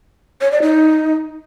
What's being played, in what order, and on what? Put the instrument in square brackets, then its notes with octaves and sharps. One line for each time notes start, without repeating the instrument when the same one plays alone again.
[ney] C#5
D5
D#4